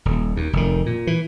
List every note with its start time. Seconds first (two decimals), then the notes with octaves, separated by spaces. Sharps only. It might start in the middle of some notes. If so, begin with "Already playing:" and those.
0.05 D#1
0.36 D#2
0.53 F1 D#3
0.86 A#2
1.07 E3